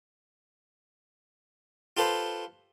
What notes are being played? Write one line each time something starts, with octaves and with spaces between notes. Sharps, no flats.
F4 G4 A4 B4 C5